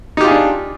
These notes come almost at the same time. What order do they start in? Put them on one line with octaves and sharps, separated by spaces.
D#4 G4 F4 G#4 D4